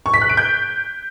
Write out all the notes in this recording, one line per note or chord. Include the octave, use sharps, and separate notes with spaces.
C#6
B6
F#6
D7
G6